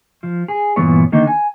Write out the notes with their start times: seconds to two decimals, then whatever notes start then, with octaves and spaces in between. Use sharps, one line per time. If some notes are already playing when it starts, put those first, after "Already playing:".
0.23 F3
0.48 G#4
0.76 G2 A#2 E3 B3 C#5
1.12 D3 D#3 A#3 D#4
1.27 G#5